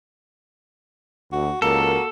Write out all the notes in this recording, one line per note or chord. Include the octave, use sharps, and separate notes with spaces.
D2 F#4
C#2 A#3 F#4 A4 A#4